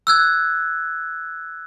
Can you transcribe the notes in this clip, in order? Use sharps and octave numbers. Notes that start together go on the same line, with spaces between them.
E6 F#6 G#6